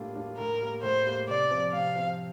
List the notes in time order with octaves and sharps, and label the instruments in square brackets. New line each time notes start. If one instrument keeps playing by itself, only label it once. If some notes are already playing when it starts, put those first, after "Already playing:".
Already playing: [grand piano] A2 G3 A#3 D4 F4
G3 A#3 D4 F4
[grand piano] A2 [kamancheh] A#4
[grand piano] G3 A#3
[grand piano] A2 [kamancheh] C5
[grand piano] G3 A#3
[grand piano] C3 [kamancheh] D5
[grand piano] F3 C4
[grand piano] C3 [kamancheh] F5
[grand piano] F3 C4